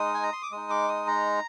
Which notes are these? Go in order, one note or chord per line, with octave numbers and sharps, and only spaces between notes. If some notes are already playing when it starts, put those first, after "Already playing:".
Already playing: G#3 D#4 D#6
G#5
A#5
C6
D6
G#3 D#4 D#6
D6
D#6
A#5